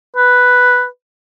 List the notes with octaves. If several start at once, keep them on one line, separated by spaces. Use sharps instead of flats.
B4